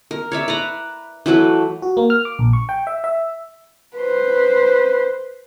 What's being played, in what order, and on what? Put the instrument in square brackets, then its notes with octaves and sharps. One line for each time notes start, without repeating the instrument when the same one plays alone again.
[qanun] A#4
C#5 D5 E5
B4 D5 A#5
E3 F#3 A3 B4
[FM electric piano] F#4
A#3
F6
D6
A#1
C#6
G5
E5
E5
[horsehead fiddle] B4 C5